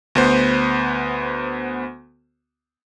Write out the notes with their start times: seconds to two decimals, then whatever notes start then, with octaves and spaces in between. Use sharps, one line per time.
0.15 D2 B3 C5